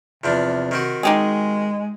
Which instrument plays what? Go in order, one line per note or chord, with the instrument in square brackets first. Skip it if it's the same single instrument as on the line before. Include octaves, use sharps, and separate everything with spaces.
[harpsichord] E2 F3 D4 [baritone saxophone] C3
[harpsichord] D#3 C4 F#4
[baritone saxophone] G#3 [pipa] D#4 G4 G#4